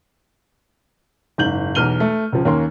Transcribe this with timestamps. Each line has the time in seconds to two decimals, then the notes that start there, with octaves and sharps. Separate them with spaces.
1.38 F#1 G#2 G6 F#7
1.75 B1 E2 F6 D#7 G7
2.00 A3
2.32 C#2 F3
2.45 D#2 A#3 C#4 C6